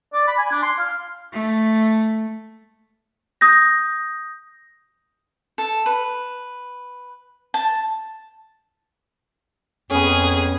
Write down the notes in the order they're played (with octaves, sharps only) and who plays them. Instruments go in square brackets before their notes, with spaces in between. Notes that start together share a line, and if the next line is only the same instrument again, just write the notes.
[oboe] D5
B5
G#5
D4
C6
F5
[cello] A3
[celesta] D#6 G6 A#6
[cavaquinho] A4
B4
A5
[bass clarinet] F2 [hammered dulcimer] B3 C#4 [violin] G#4